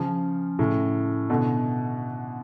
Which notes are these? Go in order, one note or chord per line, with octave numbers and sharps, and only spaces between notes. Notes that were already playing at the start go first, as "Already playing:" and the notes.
Already playing: C#3 F3
A2 C#3
B2 D3